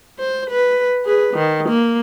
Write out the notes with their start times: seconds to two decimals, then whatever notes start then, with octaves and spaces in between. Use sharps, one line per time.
0.19 C5
0.50 B4
1.05 G#4 B4
1.34 D#3
1.69 A#3